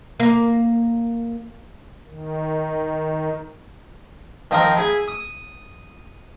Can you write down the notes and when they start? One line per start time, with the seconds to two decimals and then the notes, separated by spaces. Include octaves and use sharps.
0.20 A#3
2.08 D#3
4.51 D#3 F3 C4 A#4
4.76 E4 G#4 G#5
5.08 D#6